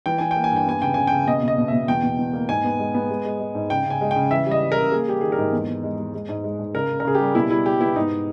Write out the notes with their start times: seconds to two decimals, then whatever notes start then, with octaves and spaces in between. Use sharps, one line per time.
0.06 E3 G5
0.18 E3 G#5
0.31 G5
0.36 A#3
0.44 G#5
0.51 G2
0.56 G5
0.67 B3 G#5
0.82 C#3 G5
0.94 C#3 G#5
1.07 C#3 G5
1.27 B2 D#5
1.43 B2
1.48 D#5
1.58 B2
1.68 B2 E5
1.88 E2 G5
2.03 B2
2.18 E2
2.33 A#3
2.49 G#2 G#5
2.64 B3
2.79 G#3
2.94 B3
3.10 G#3
3.25 G#3
3.40 G#3
3.55 G#2
3.70 C#3 G5
3.86 C#3 G#5
4.01 G#3
4.11 G5
4.16 C#3
4.31 E3 E5
4.46 G3
4.51 D#5
4.62 E3
4.72 A#4
4.77 C#3
4.92 A#3 G#4
5.07 G3 G4
5.21 D#3 G#4
5.32 A#4
5.38 G#2
5.52 E2
5.68 E2
5.83 G#3
5.98 G#3
6.14 G#3
6.29 G#2
6.44 G#3
6.59 G#2
6.74 C#3 A#4
6.90 C#3
7.00 A#4
7.05 C#3 G#4
7.15 G4
7.20 G3
7.35 B2 E4
7.50 G3 E4
7.65 G3 G4
7.81 B3 E4
7.96 G#2 D#4